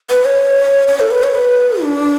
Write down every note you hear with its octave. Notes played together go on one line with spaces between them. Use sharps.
B4
C#5
C#5
A4
B4
C#5
B4
D4